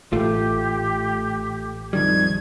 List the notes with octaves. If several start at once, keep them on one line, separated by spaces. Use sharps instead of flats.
A1 A3 F4 G4
F2 D#3 G3 G#6